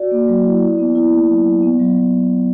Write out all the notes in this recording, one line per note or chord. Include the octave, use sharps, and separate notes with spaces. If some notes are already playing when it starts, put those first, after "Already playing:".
Already playing: F#4 D5
A#3
F#3
E4
E4
B3
E4
A#3
F#3
F#3
B3
F#3
F#3